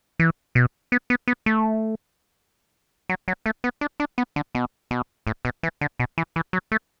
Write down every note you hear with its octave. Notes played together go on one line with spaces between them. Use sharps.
E3
B2
B3
B3
B3
A3
F#3
F#3
A3
B3
D4
D4
B3
D3
B2
B2
A2
B2
E3
D3
B2
E3
E3
F#3
A3